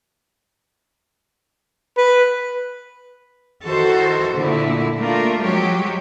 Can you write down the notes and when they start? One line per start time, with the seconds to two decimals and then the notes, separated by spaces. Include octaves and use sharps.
1.97 B4
3.66 D#3 E3 F#4 A4 C5
4.35 A#2 D3 A3 A#3 E4
4.99 A3 A#3 D4 F4 A#4
5.42 F3 F#3 G#3 G4 C#5